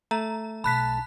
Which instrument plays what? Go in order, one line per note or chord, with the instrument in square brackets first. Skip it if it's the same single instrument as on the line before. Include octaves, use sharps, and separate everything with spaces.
[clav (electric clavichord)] A3 [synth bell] A#5
[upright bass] B1 [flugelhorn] A5 [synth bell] B5 F#6 B6